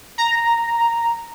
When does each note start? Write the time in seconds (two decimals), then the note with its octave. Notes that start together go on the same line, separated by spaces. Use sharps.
0.18 A#5